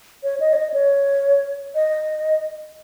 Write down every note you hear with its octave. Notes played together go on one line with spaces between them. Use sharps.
C#5
D#5
C#5
D#5
C#5
D#5